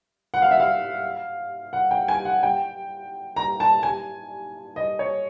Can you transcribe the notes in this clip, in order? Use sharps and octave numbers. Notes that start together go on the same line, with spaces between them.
F#5
F5
E5
F5
F#5
G5
G#5
F#5
G5
A#5
A5
G#5
D#5
C#5